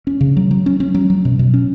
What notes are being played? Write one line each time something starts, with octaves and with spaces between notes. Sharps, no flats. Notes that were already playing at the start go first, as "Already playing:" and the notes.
C#4
C#3
F#3
F#3
C#4
C#4
F#3
F#3
B2
B2
C#4